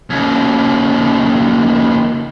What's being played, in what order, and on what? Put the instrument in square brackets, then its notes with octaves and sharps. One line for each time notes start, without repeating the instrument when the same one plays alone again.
[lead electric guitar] D#2 C#3